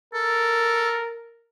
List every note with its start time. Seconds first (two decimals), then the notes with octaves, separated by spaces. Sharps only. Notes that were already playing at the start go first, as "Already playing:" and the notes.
0.14 A4 A#4